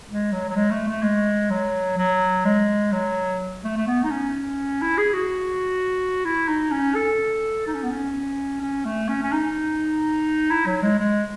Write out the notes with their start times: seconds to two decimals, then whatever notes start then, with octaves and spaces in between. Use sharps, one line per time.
0.08 G#3
0.32 F#3
0.50 F#3
0.56 G#3
0.71 A3
0.88 A3
1.02 G#3
1.50 F#3
1.98 F#3
2.45 G#3
2.92 F#3
3.64 A3
3.77 A3
3.87 B3
4.03 D#4
4.11 C#4
4.82 E4
4.98 G#4
5.13 F#4
6.25 E4
6.48 D#4
6.71 C#4
6.95 A4
7.67 D#4
7.74 C#4
7.83 B3
7.90 C#4
8.61 C#4
8.85 A3
9.09 C#4
9.23 C#4
9.32 D#4
10.51 E4
10.66 F#3
10.83 G#3
10.99 G#3